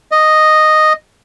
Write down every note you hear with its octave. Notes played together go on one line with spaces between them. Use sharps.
D#5